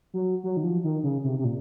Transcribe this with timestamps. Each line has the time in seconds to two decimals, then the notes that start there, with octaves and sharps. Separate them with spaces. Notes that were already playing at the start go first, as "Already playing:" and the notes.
0.14 F#3
0.44 F#3
0.57 D#3
0.64 F3
0.84 D#3
1.03 C#3
1.24 C3
1.39 C3
1.45 A#2